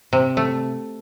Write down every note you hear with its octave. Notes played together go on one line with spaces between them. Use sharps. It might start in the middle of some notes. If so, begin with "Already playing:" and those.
C3
A3